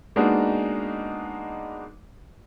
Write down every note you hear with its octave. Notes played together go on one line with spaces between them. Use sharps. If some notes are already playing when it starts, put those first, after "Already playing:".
G#3 A#3 B3 D4 D#4 F#4